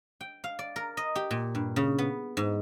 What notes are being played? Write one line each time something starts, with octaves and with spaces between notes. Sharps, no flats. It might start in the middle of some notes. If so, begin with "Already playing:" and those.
G5
F5
D5
A#4
D#5
G4
A#2
G2
C#3
B3
G#2